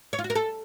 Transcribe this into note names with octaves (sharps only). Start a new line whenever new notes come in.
C#5
F4
F#4
A#4
A4